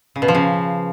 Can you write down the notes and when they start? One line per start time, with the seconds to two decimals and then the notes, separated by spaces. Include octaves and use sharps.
0.16 C#3
0.22 B2
0.28 F3
0.35 C#3